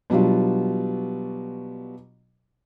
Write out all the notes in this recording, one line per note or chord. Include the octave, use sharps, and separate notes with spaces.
B2 F#3 G3 D4 F4